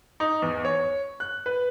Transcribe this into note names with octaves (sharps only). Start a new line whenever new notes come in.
D#4
E2
C#5
F#6
B4